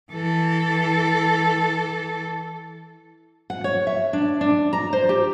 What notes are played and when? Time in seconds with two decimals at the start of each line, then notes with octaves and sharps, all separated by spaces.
0.11 E3 A4
3.50 F#5
3.64 C#5
3.87 E5
4.13 D4
4.41 D4
4.73 A#5
4.93 C5
5.09 G4